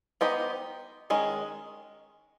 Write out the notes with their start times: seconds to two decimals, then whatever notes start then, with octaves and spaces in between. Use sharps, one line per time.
0.21 B3 D#4 G4 C5 D#5
1.10 D#3 G#3 C#4